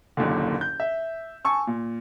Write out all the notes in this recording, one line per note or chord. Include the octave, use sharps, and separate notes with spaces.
F#1 D#2 A#2 D3
G6
E5
G#5 A5 C#6 E6
A#2